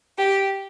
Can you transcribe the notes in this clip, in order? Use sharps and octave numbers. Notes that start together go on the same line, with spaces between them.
G4